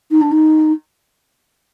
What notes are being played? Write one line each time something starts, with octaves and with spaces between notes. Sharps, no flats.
D#4
D4
D#4